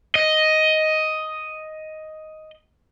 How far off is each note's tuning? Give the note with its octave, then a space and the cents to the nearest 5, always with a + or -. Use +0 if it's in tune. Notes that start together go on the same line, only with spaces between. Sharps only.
D#5 +5